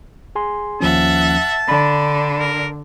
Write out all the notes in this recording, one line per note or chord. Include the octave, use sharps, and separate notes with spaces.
G#4 G#5 C6
D#2 F3 C#4 E5 F#5 A5
D3 D4 B5
A#4